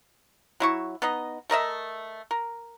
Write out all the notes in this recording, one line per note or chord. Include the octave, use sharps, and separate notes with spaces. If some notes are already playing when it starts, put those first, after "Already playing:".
F#3 E4 C#6
B3 D#4 D#5
A3 A#4 D#5 E5
A#4